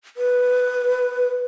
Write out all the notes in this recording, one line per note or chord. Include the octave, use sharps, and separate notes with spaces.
B4